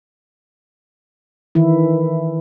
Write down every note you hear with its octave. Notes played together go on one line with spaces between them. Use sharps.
D#3 E3 E4